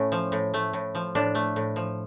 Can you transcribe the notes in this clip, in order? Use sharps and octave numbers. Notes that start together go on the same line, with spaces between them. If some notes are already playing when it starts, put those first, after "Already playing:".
Already playing: A2 A3 C#4
F3
A2
A3
A2
F3
A2 D4
A3
A2
F3